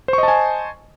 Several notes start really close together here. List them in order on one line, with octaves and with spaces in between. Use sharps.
C5 C#6 D#5 A5 G#5